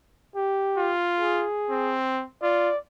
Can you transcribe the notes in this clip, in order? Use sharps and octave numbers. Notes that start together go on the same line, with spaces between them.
G4
F4
G#4
C4
F4 D5